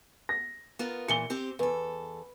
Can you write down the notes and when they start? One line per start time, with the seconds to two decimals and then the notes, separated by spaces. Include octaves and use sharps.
0.29 A#6
0.79 B3 F4 A#4
1.08 A#2 E3 C#7 G7
1.30 C4 G4 C5
1.59 E2 A4 B4